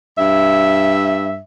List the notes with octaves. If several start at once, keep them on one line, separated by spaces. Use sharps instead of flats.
G2 E5